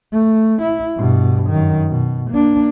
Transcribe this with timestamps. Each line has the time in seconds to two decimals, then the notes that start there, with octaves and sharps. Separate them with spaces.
0.13 A3
0.62 E4
0.96 G2 B2
1.50 F#2 D#3
1.90 B2
2.31 A#3 D4